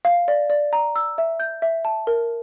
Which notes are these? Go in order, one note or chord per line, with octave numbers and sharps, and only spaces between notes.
F5
D5
D5
A#5
E6
E5
G6
E5
A5
A#4